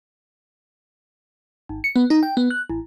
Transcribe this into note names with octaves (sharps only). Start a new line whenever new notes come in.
G#1
C#7
B3
D#4
G5
B3
F#6
A1